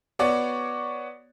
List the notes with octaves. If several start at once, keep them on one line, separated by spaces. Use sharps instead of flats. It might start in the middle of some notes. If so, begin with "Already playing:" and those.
B3 F#4 C#5 D5